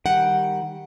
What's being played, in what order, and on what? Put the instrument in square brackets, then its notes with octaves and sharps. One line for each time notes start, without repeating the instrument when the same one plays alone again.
[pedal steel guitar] D#3 G3 G5 [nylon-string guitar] F#5